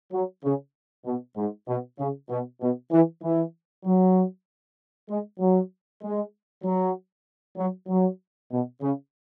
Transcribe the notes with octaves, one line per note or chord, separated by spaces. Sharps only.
F#3
C#3
B2
G#2
B2
C#3
B2
B2
E3
E3
F#3
G#3
F#3
G#3
F#3
F#3
F#3
B2
C#3